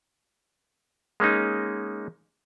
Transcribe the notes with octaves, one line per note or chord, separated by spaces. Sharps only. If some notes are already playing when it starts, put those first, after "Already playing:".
G#3 A#3 C#4 D#4